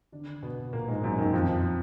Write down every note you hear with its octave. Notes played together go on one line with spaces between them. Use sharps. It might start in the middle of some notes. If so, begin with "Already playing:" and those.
D3 D4
B2 B3
A#2 A#3
G#2 G#3
F#2 F#3
D#3
F2 F3